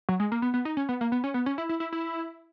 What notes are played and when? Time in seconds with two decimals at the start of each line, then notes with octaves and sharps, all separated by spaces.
0.09 F#3
0.20 G#3
0.32 A#3
0.42 B3
0.54 B3
0.65 D#4
0.77 C#4
0.89 B3
1.01 A#3
1.12 B3
1.24 C#4
1.34 B3
1.46 C#4
1.58 E4
1.69 E4
1.80 E4
1.92 E4